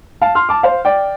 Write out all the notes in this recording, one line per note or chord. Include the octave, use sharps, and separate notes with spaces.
F5 A5
C6 F6
A5 D6
C5 F5
D5 G5